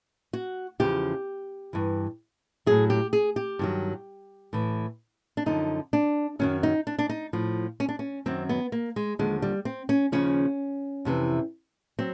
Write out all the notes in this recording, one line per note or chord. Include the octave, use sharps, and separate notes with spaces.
F#4
E2 C#3 F3 G4
G2 E3
A2 F#3 G#4
G4
G#4
G4
G2 D#3 F#3
A2 E3
D4
F#2 D3 F3 D#4
D4
F#2 D#3 F#3 C#4
D#4
D4
D4
D#4
A2 F3
C#4
D4
C#4
F#2 D#3 F#3 C4
B3
A#3
G#3
D#2 D3 F3 G#3
G3
C4
C#4
D#2 C#3 F3 C#4
F2 C3 E3
F#3 C4